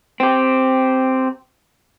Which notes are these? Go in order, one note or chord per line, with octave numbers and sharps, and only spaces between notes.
C4 G4